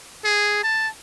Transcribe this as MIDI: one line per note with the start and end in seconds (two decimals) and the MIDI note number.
0.24 0.60 68
0.63 0.88 81